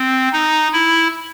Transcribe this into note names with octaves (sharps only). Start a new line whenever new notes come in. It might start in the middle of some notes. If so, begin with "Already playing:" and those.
Already playing: C4
D#4
E4